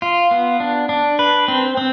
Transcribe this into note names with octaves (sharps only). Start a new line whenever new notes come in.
F4
B3
D4
D4
B4
C4
C4